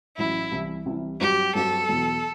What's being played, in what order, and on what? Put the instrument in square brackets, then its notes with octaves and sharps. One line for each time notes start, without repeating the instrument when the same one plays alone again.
[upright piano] A1 A2 F#3 [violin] E4
[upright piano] C2 C3 E3 G3
C2 C3 E3 G3
[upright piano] G2 F#3 C4 F#4 [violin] G4
[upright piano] G2 F#3 C4 F#4 [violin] A4
[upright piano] E2 B2 F#3